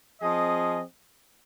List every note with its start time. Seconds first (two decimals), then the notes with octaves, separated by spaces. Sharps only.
0.21 F3 C4 G#4 D#5